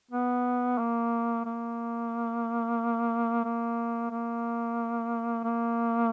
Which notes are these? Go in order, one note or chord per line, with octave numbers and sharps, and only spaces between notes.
B3
A#3
A#3
A#3
A#3
A#3